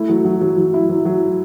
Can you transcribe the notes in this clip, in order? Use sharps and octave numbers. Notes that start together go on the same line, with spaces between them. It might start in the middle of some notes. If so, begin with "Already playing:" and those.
Already playing: A3 E4
F#3
F#3
F#3
F#3
E4
F#3
F#3